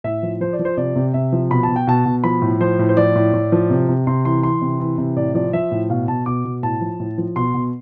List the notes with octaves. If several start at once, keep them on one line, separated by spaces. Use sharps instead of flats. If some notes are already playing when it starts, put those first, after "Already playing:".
A2 E5
F3
F3 C5
D5
F3
C5
C3 D5
C3
C3 E5
F3
B2 B5
A5
B2
G5
B2 A5
B2
F3 B5
A2
F3 C5
A2
C5
F3 D5
A2
A2
F3
C3
C3
C3 C6
E3 C6
E3 C6
C3
E3
C3
A2 D5
F3 D5
F3 E5
A2
B2 F5
B2 A5
B2 D6
B2
A2 A5
F3
A2
F3
B2 C6
B2